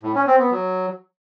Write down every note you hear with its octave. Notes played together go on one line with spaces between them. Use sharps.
A2
C#4
C4
B3
F#3